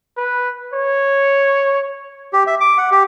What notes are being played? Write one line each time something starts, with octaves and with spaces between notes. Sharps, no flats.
B4
C#5
G4
E5
D6
F#5
G4